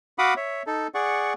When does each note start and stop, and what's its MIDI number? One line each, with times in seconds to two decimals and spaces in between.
0.19 0.34 66
0.19 0.34 77
0.19 0.34 78
0.19 0.34 83
0.19 0.34 86
0.19 0.34 87
0.37 0.63 73
0.37 0.63 76
0.67 0.87 63
0.67 0.87 69
0.95 1.33 68
0.95 1.33 74
0.95 1.33 78
0.95 1.33 85